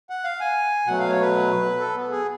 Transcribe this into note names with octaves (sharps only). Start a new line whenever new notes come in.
F#5
F5
G#5
B2 F#3 A3 F#5
F5
C#5
B4
A4
B3
G#4